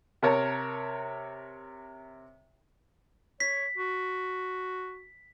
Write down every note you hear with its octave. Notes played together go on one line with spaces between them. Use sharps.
C3 A#4 C#5 A5
C#5 B6
F#4